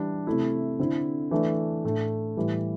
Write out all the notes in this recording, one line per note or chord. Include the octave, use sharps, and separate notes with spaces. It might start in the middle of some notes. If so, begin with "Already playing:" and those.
Already playing: E3 G3 D4
C3 A3 E4
D3 C4 E4
E3 A3 D4
A2 A3 D4
A2 E3 G3 E4